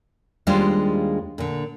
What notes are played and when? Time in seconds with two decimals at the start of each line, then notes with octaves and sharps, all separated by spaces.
0.47 D#2 G3 G#3 D4 F4 C5
1.38 A#2 D3